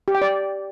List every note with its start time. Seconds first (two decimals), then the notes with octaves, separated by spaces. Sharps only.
0.08 G4
0.15 G5
0.22 D5